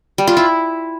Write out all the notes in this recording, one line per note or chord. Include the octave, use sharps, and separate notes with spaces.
G3
F4
E4